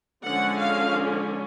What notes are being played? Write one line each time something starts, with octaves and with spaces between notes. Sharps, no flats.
D3 F3 G#3 C#4 F#5
F5